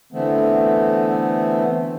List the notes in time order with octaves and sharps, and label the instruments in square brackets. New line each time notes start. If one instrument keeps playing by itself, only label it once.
[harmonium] D3 E3 A3 B3 C4